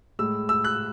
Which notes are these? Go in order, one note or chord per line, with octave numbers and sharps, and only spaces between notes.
A2 G#3 E6
E6
F#6